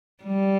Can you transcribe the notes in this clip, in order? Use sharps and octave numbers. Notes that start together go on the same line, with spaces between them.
G3